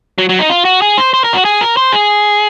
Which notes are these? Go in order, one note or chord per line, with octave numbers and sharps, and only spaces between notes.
F#3
F#3
D#4
F4
F#4
G#4
C5
C5
A#4
F#4
G#4
A#4
C5
G#4